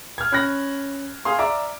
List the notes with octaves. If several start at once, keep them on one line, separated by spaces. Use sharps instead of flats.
F6 G#6
C#4 B5 F#6 A#6
G#4 F5 C6
D5 E5 A#5 D6